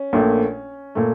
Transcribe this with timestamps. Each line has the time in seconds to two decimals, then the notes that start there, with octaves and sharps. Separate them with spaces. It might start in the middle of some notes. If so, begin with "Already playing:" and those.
Already playing: C#4
0.13 A#1 A#2 A3
0.95 A#2 A3